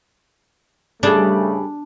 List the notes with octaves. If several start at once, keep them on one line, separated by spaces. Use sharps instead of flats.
G2 C#3 G3 A3 D4 G#4 A4